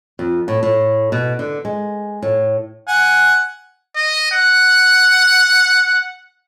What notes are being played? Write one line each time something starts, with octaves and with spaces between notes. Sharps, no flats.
F2
A2
A2
B2
D3
G#3
A2
F#5 G#5
D#5
F#5